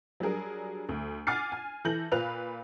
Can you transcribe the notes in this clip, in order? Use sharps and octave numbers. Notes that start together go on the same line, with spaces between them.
F#3 G3 D4 G#4 A#4
D2
F#5 G#5 D6 F6 A6 C7
G#5
E3 A4 G6 A#6 F#7
A#2 F4 B4 F5 F#6 F7